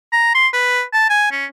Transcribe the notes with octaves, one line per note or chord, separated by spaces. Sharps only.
A#5
C6
B4
A5
G#5
C#4